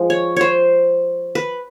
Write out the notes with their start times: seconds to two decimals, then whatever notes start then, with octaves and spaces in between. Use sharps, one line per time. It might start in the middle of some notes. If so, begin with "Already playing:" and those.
Already playing: F3 G#3
0.10 C#5
0.36 C5 C#5
1.35 B4